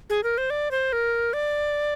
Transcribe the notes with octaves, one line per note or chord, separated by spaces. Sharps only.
G#4
A#4
C5
D5
C5
A#4
D5